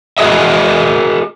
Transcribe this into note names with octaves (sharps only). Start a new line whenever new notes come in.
F#4 G#4 D#5 E5